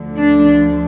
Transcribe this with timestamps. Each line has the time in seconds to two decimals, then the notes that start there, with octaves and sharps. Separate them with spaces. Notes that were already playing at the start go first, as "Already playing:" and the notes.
Already playing: D2 D3 F3
0.18 D4